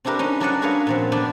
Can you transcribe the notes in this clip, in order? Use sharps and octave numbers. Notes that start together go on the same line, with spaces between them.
C4 D4 E4 G4 A#4 B4
C#4 D#4
F#3 D4 B4 D5 D#5 F#5
F#4 G#4 A#4 B4 C#5 F5
A#2 F3 C4
B3 D4 B4 D5 G5